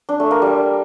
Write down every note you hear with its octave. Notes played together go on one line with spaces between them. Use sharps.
D4
A3
A#3
G3